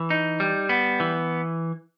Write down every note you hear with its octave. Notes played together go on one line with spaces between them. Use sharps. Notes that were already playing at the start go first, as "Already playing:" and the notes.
Already playing: E3
D#4
G3
B3
E3